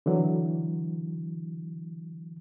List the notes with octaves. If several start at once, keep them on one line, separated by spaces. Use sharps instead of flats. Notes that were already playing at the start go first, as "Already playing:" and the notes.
D3 E3 F#3